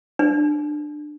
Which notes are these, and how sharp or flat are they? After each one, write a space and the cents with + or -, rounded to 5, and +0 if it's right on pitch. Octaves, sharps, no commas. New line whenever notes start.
D4 +20